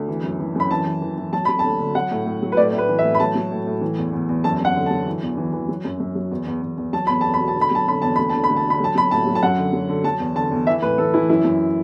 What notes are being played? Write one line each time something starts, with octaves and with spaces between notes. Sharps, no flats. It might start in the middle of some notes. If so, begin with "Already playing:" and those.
Already playing: D2
E3
F#2
E3
F#2 B5
E3 A5
E3
E3
E3
F#3 A5
F#3 B5
D2 A5
D3
F#3 F#5
A2
A2
F#3
B4
A2 D5
A2
B4
E3
E5
A2
B5
F#3 A5
F#3
A2
A2
E3
E2
E2
E2
F#2 A5
F#2
F#5
D3
A5
F#3
E3
E2
E3
E3
F#3
F#2
F#2
F#3
E2
E2
E2
E2
F#3 A5
E2 B5
E2 A5
B5
B2
A5
D3
B5
F#3 A5
D3 B5
E2 A5
D2 B5
D3 A5
B5
D2
A5
D3
B5
F#3 A5
F#3 B5
A2 A5
F#3
A5
F#2 F#5
D3
F#3
D3
F#3 A5
E2
D3 A5
E2
E3 E5
A2 B4
E3 A4
E3 E4
F#2 E4
F#2